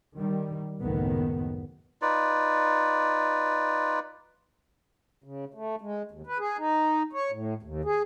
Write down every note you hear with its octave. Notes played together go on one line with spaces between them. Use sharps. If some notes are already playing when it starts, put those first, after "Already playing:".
D#3 G3
F#1 C#2 A2 D#3 B3
D#4 F4 B4 D5
C#3
A3
G#3
D#2
B4
G#4
D#4
C#5
A2
D#2
G#4